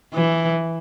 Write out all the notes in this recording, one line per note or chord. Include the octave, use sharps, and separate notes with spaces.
E3